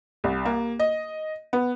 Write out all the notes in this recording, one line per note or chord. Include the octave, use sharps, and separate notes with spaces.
C2
A#3
D#5
B3